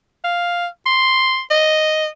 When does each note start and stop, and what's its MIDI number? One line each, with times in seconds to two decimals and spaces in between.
0.24 0.67 77
0.86 1.41 84
1.50 2.07 75